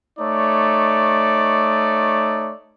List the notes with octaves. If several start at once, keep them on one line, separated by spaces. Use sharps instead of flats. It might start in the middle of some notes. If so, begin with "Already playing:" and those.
A3 D#4 C#5 D5